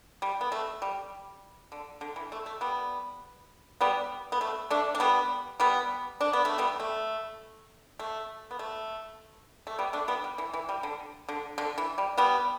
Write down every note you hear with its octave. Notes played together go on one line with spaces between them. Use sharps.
G3
B3
A3
G3
D3
D3
E3
A3
A3
G3 B3
G3 B3
B3
A3
A3 D4
D4
G3 B3
G3 B3
D4
B3
A3
G3 B3
A3
A3
B3
A3
A3
G3 B3
A3 D4
G3 B3
G3
E3
E3
G3
D3
D3
D3
E3
G3
G3 B3